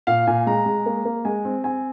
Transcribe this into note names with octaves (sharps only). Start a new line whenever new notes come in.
A#2 F5
A#2 G#5
G#3 A#5
G#3
A#3
A#3
G#3 G#5
C4
C4 G#5